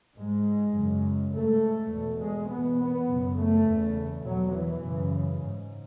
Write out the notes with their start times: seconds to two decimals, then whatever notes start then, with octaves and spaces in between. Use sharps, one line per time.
0.17 G#2 G#3
0.75 F#2 C#3
1.33 G#2 A3
1.91 E2 B2
2.21 G#3
2.49 E2 B2 B3
2.79 B3
3.07 F#2 C#3
3.36 A3
3.66 E2 C#3
4.23 E2 B2 F#3
4.53 E3
4.82 F#2 C#3
5.40 G#2